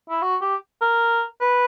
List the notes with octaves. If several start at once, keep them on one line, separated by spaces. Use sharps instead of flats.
E4
F#4
G4
A#4
B4